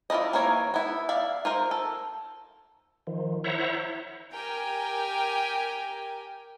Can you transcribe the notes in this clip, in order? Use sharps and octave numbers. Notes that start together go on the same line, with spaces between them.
E4 F4 B4 D5 D#5
E3 A#3 A#4 C#5
B3 E4
D5 E5 F5
F4 A#4 C5
A4
D#3 F3
E4 C5 C#5 E5 F#5 A#5
G4 A#4 G5 G#5